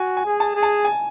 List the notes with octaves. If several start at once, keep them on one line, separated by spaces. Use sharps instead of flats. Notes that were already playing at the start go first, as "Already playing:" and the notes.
Already playing: F#4 G#5
G#5
G#4
A5
G#4
A5
G#5